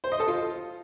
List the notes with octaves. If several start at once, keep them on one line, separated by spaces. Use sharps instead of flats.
C5
D#5
A4
F4